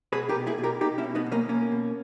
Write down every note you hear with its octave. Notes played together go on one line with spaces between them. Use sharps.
B2 G#4 B4
G4 A#4
B2
E4 G#4
B2
G4 A#4
B2 D#4 G4
C#4 E4
B2
B3 D#4
B2
A#3 C#4
B2 A#3 C#4
B2